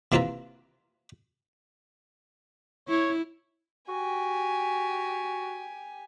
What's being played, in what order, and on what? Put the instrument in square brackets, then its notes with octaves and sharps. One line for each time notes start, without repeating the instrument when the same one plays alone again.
[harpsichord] C3 A#3 E4 F4 A#4 B4
[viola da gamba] E4 [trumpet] C#5
[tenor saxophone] F#4 [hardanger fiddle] G4 G#5